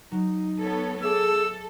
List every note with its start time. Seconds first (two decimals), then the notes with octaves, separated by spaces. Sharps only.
0.12 F#3 D#4
0.59 B3 A4 C#5
1.02 G#4 A4 E5 D6 E6